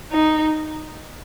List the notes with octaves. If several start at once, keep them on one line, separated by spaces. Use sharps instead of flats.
D#4